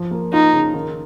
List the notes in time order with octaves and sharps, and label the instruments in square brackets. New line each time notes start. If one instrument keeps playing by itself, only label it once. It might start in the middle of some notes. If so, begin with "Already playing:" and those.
Already playing: [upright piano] F3
A#3
[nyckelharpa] D#4 [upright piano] F4
[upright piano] C#3
D#3